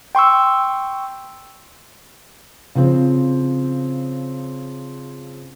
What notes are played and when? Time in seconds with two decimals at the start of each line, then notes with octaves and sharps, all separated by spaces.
0.15 G5 C6 C#6 E6
2.75 C#3 F3 C4 C5